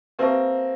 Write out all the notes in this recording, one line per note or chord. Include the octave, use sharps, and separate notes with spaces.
A#3 C4 G4 B4 E5 A5 C#6